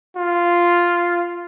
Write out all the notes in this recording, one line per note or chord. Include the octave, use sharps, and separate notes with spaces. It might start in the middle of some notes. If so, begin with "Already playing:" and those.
F4